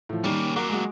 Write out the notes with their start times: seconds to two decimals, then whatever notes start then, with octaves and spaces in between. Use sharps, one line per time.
0.09 A2 F3
0.24 D#3 G3 A#3 C#4
0.56 F#3 A#3 A#4 F#5 D6
0.70 G#3 F#4